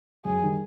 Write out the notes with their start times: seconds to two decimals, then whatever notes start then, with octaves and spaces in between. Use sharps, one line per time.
0.25 F#2 G#4
0.41 D#3 G3